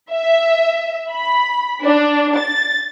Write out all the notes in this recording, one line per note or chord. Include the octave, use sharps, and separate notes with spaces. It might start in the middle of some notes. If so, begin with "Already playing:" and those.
E5
B5
D4
A6